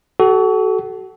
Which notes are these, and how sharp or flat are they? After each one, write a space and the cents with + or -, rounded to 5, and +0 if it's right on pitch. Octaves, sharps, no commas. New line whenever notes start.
F#4 +30 A4 -25